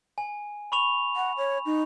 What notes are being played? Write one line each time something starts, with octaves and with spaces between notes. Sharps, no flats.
G#5
B5 C#6 F7
F#5
C#5
D#4